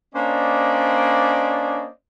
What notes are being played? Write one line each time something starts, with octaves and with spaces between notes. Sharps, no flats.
A#3 C#4 D4 C5 D5 D#5